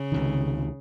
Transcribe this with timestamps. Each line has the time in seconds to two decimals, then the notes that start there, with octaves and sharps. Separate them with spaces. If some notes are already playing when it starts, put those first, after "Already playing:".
Already playing: C#3
0.12 C#2 C3 D#3